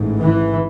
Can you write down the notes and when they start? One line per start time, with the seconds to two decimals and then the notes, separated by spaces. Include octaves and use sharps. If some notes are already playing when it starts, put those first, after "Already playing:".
Already playing: A1 G#2
0.18 E3